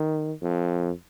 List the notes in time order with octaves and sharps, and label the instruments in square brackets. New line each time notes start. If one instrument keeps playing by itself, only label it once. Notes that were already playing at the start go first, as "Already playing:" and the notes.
Already playing: [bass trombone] D#3
F2